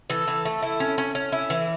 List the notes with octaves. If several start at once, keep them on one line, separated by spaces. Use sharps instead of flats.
E3 A4
E3
A3
E4
C#4
C#4
C#4
E4
E3